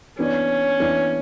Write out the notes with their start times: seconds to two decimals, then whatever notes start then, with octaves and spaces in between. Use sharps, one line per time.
0.18 E3 B3 C#4 D4
0.80 E3 B3 D4